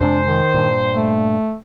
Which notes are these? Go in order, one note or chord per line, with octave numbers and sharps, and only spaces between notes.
F2 C3 G#3 D4 C5
D#3
G2 A#2
A3